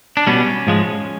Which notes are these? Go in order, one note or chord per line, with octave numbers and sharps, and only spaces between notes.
D4
B2 G3 B3 C#4
G#2 F3 G#3